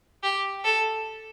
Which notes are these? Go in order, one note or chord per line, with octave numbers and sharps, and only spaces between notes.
G4
A4